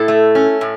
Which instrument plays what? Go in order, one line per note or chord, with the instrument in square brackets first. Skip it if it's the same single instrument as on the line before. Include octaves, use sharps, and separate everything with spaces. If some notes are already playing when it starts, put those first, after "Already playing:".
Already playing: [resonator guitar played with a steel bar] A2 E4 A4
A3
C#4
A2